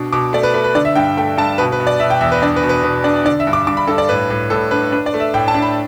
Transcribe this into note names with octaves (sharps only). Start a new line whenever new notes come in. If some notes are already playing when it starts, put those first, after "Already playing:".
Already playing: B2 D4
B2 D6
A3 D5
B4
A3 B4
B4
D3 D5
E5
G2 G5
A3 G5
G2 A5
B2 B4
B4
B2
D5
B2 E5
G5
E2 E5
B4
D4 D5
B4
B2
B4
B2 B4
D4 D5
D3 D5
E5
G2
D6
G2 D6
B5
G2 A4
D5
A2 B4
A2
A2 A4
D4 B4
D4 B4
D5
A3
E5
A2 G5
A5
D4
B5